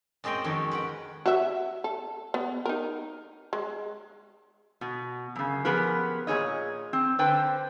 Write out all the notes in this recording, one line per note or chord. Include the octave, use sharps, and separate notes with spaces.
F#2 G#3 C4 D#5 G5
F2 D#3 C#4
B4 F#5 G5
F#4 E5
A4
B3
D#4 A#4
G#3
B2
F#2 C#3
F3 B3 G4 G#4 A#4 B4
A#2 D#3 G#4 C#5 D#5
C4
D3 B4 C5 G5 A5